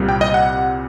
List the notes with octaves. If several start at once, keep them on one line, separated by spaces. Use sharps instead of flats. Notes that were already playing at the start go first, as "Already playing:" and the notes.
Already playing: C2 A#2 G3 C4
G5
D#5
F#5